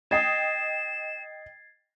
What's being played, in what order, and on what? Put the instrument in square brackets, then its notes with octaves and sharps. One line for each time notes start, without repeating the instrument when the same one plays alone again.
[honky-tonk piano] D#5 G5 D#6 [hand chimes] G#6 A6 C7 [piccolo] E7